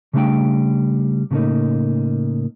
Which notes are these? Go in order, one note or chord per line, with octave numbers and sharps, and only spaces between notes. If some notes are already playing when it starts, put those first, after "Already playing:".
C#3 G3 A3 D4 F5 G5
A2 C#3 G3 A3 A#3 D#4